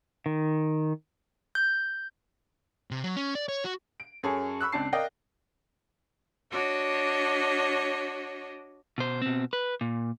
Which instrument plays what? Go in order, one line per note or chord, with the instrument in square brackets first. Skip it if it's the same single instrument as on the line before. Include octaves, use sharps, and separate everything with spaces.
[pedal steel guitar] D#3
[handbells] G6
[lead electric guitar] C3
F#3
C#4
D5
C#5
F#4
[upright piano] D7
F#2 G#4 A4 C#5
B5 C#6 E6 F#6
C#2 C4 D4 A5 C7
A#4 D5 D#5 F5 G5
[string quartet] D4 F#4 C#5 D#5
[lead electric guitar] B2 C5
B2 C4
B4
A#2